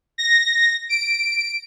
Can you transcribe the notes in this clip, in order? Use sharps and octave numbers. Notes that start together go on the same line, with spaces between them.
A#6
D7